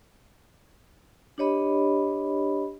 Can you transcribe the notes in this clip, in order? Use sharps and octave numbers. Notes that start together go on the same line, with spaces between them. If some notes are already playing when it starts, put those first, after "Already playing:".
D4 G4 C#5 D#5 B5